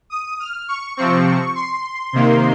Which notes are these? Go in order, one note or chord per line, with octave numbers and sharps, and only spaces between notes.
D#6
F6
C#6
C3 F3 C4 C#6
C6
C3 D#3 A#3